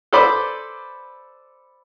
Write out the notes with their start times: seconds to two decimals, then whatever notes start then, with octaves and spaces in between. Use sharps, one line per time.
0.13 A4 B4 C5 D5 B5 D6